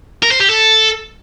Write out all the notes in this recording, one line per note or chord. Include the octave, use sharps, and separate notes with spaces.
A#4
C5
G4
A4